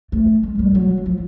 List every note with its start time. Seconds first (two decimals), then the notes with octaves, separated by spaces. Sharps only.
0.12 A3
0.43 G#3
0.59 G3
0.75 F#3
1.06 F3